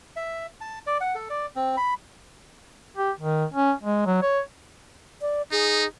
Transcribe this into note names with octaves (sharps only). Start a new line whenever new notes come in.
E5
A5
D5
F#5
A4
D5
C4
B5
G4
D#3
C#4
G#3
F#3
C#5
D5
D#4 G#4